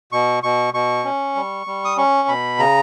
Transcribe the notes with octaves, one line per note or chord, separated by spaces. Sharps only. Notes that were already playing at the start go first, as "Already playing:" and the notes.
B2 C#6
B2 C#6
B2 C#6
C#4
G3
G3
D#6
C#4 C#6
B2 B5
C#3 A#5